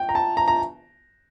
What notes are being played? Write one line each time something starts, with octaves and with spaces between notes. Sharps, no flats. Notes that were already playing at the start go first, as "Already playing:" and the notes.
Already playing: G5
A#5
A5
A#5
A#5